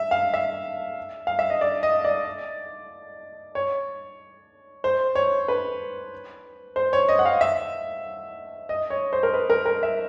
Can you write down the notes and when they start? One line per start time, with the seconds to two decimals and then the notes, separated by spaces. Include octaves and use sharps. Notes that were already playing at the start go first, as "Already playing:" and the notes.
Already playing: E5
0.11 F5
0.34 E5
1.27 F5
1.39 E5
1.50 D#5
1.61 D5
1.83 D#5
2.04 D5
3.55 C#5
4.84 C5
5.15 C#5
5.48 B4
6.76 C5
6.93 C#5
7.09 D#5
7.19 F#5
7.25 F5
7.41 E5
8.69 D#5
8.90 C#5
9.13 C5
9.23 A#4
9.34 B4
9.50 A#4
9.65 A#4
9.83 E5